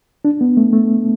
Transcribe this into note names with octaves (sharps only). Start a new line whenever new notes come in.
D4
B3
A3
A3